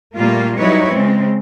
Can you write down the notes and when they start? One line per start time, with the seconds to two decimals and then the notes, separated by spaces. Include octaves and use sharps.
0.15 A#2 G3 A3 A#3 F4
0.57 F#3 G3 D#4 E4 B4 C#5
0.93 C#3 G#3 C4